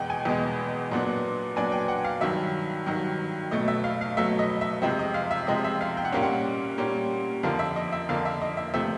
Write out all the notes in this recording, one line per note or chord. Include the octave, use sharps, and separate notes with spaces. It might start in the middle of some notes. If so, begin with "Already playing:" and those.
Already playing: E2 B2 G#3 F#5 G5
G#5
E2 B2 G#3
A#2 F#3 B3 D4
A#2 F#3 B3 D4 G#5
G5
F#5
F5
G2 D#3 F#3 E5
G2 D#3 F#3
B2 F#3 A3 D#5
E5
F5
F5
B2 F#3 A3 E5
D#5
E5
C3 F3 G#3 C4 E5
D#5
F5
E5
C3 F3 G#3 C4 D#5
E5
F5
G5
F#5
A#2 G3 A#3 C#4 F5
F#5
A#2 G3 A#3 C#4
F2 D3 F3 A#3 F5
E5
D#5
E5
F2 D3 F3 A#3 F5
E5
D#5
E5
C3 F3 A3 C4 E5